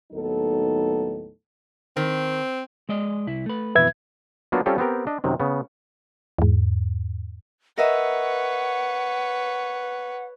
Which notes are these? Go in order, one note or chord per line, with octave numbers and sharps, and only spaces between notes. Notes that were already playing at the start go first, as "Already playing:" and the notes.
D#2 A2 F#3 B3 D#4 A4
D#3 C4
G#3 D5 D#5
C2 E4
A3 B4
F2 B2 E3 B4 E5 G#6
F#3 A#3 B3 D4 F4 F#4
G3 C4 C#4 F4 G4 A4
B3 C4 G4 A#4
D4 D#5
F#2 C3 D#3
C#3 B3
E2 G#2
A#4 B4 C#5 D#5 E5 F#5